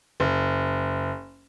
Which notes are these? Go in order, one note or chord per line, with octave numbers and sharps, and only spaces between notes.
F#1